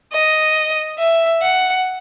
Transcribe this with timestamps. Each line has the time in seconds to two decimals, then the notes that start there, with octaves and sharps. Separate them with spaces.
0.13 D#5
0.99 E5
1.42 F#5